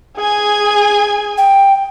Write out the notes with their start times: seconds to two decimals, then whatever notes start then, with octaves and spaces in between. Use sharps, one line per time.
0.17 G#4 G#5
1.38 G5